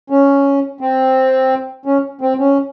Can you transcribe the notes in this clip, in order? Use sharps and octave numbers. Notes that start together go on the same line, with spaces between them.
C#4
C4
C#4
C4
C#4